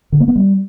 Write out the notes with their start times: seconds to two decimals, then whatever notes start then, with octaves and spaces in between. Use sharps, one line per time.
0.12 D3
0.20 A#3
0.28 B3
0.36 G3